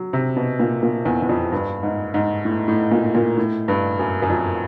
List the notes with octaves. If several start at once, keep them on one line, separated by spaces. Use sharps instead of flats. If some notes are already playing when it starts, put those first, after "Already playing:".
Already playing: F#3
C3
B2
A#2
A#2
E2
E2
F2
G2
G#2
G#2
A2
A2
A#2
A#2
A2
G2
F#2
F#2
F2